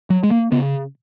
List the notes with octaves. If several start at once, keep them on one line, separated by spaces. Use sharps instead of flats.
F#3
G#3
A#3
C#3 B3